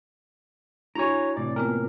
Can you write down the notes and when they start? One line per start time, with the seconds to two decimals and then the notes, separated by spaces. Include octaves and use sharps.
0.95 D4 E4 F#4 C#5 G#5 A#5
1.37 A2 C3 E3 D5
1.56 A#3 B3 F4 A#4